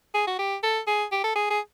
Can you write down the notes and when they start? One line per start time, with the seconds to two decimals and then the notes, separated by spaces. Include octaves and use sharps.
0.14 G#4
0.27 F#4
0.39 G4
0.63 A4
0.87 G#4
1.12 G4
1.24 A4
1.35 G#4
1.50 G#4